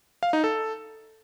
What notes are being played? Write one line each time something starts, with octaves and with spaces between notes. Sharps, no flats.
F5
D#4
A4